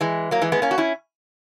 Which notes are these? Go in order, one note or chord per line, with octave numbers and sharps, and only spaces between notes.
E3 G#3
F#3 A#3
E3 G#3
G#3 B3
A#3 C#4
F#4
C#4 E4